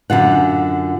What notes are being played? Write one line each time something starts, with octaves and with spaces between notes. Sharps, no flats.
F#2 D3 F4 F#5